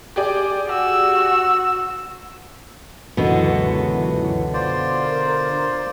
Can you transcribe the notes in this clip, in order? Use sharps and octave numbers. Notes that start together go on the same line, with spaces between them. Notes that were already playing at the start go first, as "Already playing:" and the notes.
G4 G#4 D5
F#4 E6
C#2 F#2 B2 D3 E3 B3 F#4
F4 C5 D5
A#4